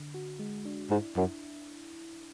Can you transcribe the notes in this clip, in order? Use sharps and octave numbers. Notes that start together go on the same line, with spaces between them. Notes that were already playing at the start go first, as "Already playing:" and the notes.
Already playing: D3
F#4
G#3
D4
G#2 E4
F#2 E4